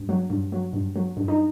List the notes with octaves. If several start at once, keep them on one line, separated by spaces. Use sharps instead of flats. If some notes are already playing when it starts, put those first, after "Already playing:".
Already playing: G2
F#3
G2
F#3
G2
F#3
G2
D#4